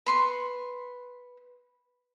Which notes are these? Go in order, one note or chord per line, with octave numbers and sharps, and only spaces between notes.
B4 C6 C#6